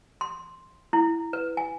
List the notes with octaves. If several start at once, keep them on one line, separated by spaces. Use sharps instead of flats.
C6
E4
B4
G#5